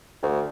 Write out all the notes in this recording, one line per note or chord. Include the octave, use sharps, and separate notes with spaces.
D2